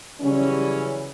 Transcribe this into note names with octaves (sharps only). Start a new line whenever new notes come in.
C#3 E3 F#3 G3 C#4